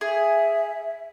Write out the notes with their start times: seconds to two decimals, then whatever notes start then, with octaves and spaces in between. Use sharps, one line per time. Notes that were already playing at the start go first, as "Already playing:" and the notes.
0.01 G#4 E5